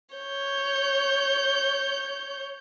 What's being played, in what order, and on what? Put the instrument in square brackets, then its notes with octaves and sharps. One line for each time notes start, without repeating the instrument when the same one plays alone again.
[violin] C#5 G6